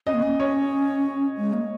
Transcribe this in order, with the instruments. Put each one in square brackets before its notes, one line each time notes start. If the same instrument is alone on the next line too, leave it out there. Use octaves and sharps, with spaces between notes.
[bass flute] C#4 [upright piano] D#5
[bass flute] A#3
C#4
[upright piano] C#5
[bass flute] G#3
A#3